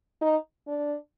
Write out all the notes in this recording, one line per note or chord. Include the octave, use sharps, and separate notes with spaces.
D#4
D4